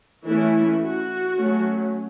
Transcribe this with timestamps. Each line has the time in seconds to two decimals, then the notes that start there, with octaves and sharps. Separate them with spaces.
0.25 E3 A3 C#4 E4
0.80 F#4
1.36 F#3 A3 C#4